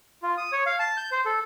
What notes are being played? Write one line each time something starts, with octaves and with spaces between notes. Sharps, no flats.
F4
D#6
C#5
F5
A5
G6
C5
A4